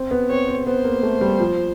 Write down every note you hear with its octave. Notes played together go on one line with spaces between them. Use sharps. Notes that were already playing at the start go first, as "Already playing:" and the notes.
Already playing: C4
B3
C4 C#5
C4
B3 C5
A#3
A3
G3
F3